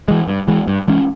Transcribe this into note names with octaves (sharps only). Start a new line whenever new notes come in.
E3 G#3
G2
E3 G#3
G2
E3 G#3 C#4